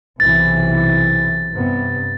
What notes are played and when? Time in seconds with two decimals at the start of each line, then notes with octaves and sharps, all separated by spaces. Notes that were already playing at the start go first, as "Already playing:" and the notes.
0.20 B1 C3 E3 A6
1.54 G2 C3 B3